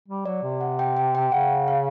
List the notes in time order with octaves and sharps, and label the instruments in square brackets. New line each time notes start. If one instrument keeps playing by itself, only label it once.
[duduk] G3
[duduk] F#3 [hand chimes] D5
[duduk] C3
[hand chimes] F#5
G5
G5
G5
[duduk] C#3 [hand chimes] F#5
[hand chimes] F5